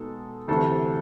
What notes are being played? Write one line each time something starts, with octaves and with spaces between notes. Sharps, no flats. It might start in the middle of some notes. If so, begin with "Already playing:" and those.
Already playing: B2 G#3 B3 D#4 A4
D2 C3 E3 A3 C4 A4